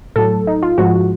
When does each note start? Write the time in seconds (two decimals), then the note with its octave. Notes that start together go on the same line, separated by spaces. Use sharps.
0.16 A2 F#3 A4
0.47 D#4
0.63 F4
0.78 G#2 F3 G#3 F#4